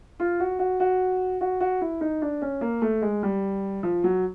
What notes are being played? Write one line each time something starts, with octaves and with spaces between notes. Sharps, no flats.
F4
F#4
F#4
F#4
F#4
F#4
E4
D#4
D4
C#4
A#3
A3
G#3
G3
F3
F#3